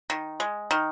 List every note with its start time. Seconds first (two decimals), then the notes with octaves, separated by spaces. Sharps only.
0.10 D#3
0.40 G#3
0.71 D#3